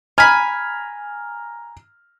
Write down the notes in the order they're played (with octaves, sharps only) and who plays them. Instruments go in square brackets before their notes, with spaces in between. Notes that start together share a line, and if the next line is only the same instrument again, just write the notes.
[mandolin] G#5 B5 [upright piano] A#5 F6